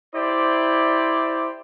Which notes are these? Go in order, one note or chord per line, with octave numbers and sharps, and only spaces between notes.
E4 G4 C5 D5